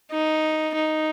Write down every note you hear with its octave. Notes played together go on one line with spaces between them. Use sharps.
D#4
D#4